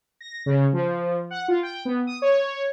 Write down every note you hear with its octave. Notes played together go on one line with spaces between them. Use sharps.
A#6
C#3
F3
F#5
F4
G5
B3
D#6
C#5